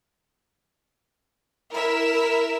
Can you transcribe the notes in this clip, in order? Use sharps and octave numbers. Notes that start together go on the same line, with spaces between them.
E4 A#4 E5